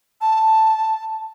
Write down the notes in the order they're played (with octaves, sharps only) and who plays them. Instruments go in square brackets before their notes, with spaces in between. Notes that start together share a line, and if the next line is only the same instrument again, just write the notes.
[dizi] A5